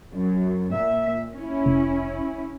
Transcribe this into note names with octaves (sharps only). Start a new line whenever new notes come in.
F#2
A#2 E5
C#4 E4
F1